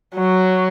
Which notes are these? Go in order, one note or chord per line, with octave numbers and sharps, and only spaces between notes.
F#3